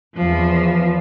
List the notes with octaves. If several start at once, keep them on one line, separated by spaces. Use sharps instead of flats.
E2 F3